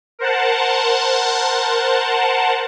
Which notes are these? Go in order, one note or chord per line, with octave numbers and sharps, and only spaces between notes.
A#4 C5 F#5 A5